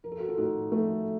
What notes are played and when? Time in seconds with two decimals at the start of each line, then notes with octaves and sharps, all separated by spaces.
0.03 F3 A#4
0.12 A4
0.20 F#4
0.28 F4 A4
0.38 A2 D#4 F#4
0.72 F3 A3